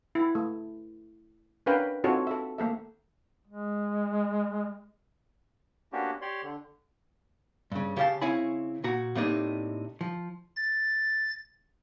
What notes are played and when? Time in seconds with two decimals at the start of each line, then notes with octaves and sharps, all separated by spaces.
0.15 E4
0.35 A3
1.66 C#4 D4 A#4 B4 F5 G5
2.04 C4 D#4 F4 F#4 A4 C#5
2.27 A4 E5
2.58 A3 A#3 A4 E5
3.47 G#3
5.93 A#3 B3 C#4 D4 F#4 G4
6.22 G4 C#5 D5 C6
6.43 D3
7.72 G2 C#3
7.96 C#3 G4 C#5 F5 A5
8.21 C#3 C4 E4 C#5 G#5 B5
8.84 A#2 F#4 A#5
9.15 A2 C3 A3 A#3 D4 D#4
10.01 F3
10.56 A6